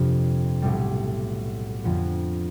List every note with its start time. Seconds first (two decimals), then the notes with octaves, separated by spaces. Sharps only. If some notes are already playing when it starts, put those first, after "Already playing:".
Already playing: G1 F2 C3 F3
0.62 B1 A2 G3
1.84 F2 D3 F3 B3